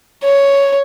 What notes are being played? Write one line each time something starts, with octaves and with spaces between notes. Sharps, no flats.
C#5